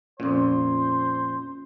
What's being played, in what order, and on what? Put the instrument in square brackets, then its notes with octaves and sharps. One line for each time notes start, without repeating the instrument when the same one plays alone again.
[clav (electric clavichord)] F2 A#2 [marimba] C#4 [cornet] C5